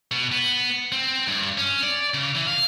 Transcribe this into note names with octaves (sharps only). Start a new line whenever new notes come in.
B2
B3
C4
G2
C#4
D5
C#3
E3
F5